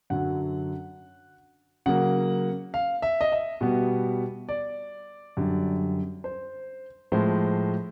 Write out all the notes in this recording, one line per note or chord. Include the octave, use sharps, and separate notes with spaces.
F#2 D3 F#3 F#5
C#3 F#3 A#3 F#5
F5
E5
D#5
E5
B2 G3 B3
D5
F#2 D3 G3
C5
A2 F3 G#3 C5